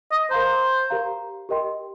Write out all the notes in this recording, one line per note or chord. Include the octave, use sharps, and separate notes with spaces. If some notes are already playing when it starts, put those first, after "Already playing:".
D#5
A#4 C5 F5 A#5
G4 A#4 F5 A#5
G4 A#4 D#5 G5 C6